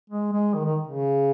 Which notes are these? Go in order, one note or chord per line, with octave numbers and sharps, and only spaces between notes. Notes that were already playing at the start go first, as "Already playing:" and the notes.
G#3
G#3
D#3
D#3
C#3